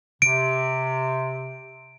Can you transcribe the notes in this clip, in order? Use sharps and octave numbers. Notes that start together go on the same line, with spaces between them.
C3 D7